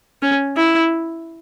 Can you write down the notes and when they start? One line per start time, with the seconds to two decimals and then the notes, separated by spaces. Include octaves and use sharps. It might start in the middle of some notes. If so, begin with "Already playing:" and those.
0.22 C#4
0.57 E4